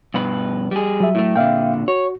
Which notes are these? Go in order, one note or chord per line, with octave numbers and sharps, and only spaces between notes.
G2 B2 B4
G3 G#4
F#3 E5
A2 A3
A#2 D3 E5 F5 G5
F#4 C#5